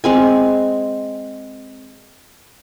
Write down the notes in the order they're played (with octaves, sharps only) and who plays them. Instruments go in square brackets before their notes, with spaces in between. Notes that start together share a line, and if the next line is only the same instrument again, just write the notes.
[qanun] G#3 C4 G#5